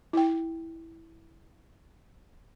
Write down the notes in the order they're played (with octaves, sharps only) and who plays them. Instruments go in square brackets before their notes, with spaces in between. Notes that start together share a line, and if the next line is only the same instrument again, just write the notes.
[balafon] E4 G5